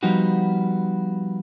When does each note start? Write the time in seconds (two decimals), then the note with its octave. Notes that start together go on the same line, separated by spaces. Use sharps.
0.03 F3 G3 B3 D#4 F#4